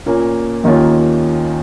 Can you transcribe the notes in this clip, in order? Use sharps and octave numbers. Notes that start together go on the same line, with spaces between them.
A#2 A#3 C#4
D#2 D#3 A#3 C#4 F4